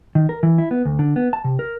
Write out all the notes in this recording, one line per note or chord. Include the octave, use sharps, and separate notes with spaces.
D#3
A#4
E3
E4
B3
D2
D3
B3
A5
C3
A#4